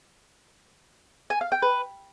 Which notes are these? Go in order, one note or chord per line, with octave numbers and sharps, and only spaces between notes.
G#5
F5
G5
B4